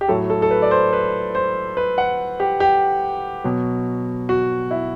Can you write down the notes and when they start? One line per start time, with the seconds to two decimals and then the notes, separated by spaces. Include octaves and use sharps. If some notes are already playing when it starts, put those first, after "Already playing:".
0.01 G4
0.08 A2 F#3 A4
0.30 A4
0.42 A4
0.51 B4
0.62 D5
0.71 C5
0.93 B4
1.35 C5
1.77 B4
1.98 F#5
2.40 G4
2.60 G4
3.44 B2 F#3
4.29 F#4
4.71 E4